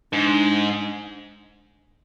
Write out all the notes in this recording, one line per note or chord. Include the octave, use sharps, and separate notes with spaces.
G#2 D4